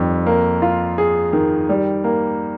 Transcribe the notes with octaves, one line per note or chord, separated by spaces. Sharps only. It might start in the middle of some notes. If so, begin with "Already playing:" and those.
Already playing: F2 D#3 G3
A#3
F4
G#4
D#3
G3
A#3